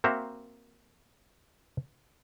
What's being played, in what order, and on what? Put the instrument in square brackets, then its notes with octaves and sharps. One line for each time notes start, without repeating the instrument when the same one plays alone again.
[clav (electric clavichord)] A#3 C4 F#4 C5 E5 A#5